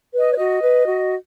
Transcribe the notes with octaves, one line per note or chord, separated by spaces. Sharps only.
B4
D#5
C#5
F#4 D#5
B4
F#4